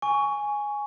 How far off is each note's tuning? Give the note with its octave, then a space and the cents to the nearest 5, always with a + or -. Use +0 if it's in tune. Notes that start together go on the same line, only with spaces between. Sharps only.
G#5 +0 C#6 +15